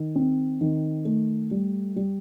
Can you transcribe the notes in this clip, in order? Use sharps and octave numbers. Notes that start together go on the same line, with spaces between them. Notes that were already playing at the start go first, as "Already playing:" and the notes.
Already playing: D#3
C4
D#3
A3
G3
G3